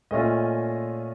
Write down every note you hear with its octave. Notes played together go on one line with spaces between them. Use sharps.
A#2 A3 C#4 F4 D#5